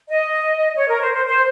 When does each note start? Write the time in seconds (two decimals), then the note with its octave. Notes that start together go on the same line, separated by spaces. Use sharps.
0.09 D#5
0.76 C#5
0.89 A#4
1.01 C5
1.13 C5
1.26 C5